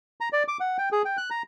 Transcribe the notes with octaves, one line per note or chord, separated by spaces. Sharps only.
A#5
D5
D6
F#5
G5
G#4
G5
F#6
A#5